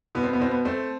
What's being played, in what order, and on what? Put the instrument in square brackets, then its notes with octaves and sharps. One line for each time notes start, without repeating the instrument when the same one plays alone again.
[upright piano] B2 B3
C4
B3
B2 C4
B3
A3 C4